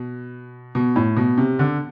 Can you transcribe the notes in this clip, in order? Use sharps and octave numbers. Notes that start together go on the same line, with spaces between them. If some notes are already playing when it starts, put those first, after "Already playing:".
Already playing: B2
B2
A2
B2
C3
D3